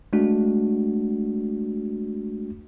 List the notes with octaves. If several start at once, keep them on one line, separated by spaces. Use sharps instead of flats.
G#3 A3 D4 F#4